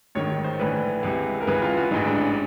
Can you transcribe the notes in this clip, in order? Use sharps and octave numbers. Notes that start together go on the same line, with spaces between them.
A1 G#2 D#3 C#5
C5
A#1 A2 E3 B4
C#2 C3 E3
A#4
C#2 C#3 E3 B4
F4
F#4
A1 G#2 E3 D#4
D4
C#4